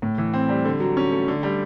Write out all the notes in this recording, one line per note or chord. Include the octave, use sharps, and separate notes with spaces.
A2
E3
C4
G3
D3
F#3
C#4
A3
D3
G3